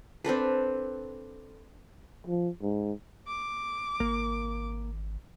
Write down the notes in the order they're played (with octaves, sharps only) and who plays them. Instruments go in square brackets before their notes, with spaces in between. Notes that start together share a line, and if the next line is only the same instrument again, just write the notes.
[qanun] C4 D4 A4 B4
[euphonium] F3
G#2
[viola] D6
[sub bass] G#1 [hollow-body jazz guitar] A#3